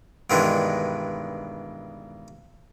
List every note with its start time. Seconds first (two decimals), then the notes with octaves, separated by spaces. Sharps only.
0.30 G2 B2 D#3 E3 G#3 D4